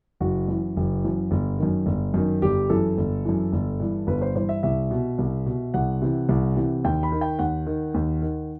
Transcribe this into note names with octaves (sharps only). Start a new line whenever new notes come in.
F#1 F#4
F#2 E3
F#1
F#2 E3
G1
F#2 D#3
G1
F#2 D#3
G1 G4
F#2 E3 A4
G1
F#2 E3
G1
G2 E3
G1 B4
C5
G2 E3 C5
E5
C2 E5
B2
C2
B2
C2 F#5
C3 E3
C2
C3 E3
D#2 G5
B5
D#3
G5
D#2 F#5
D#3
D#2
D#3